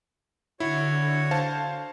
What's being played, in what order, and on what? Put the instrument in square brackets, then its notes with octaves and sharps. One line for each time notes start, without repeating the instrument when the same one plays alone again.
[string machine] D3 [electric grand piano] E4 [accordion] F#4 C#5
[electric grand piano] C5 F5 A5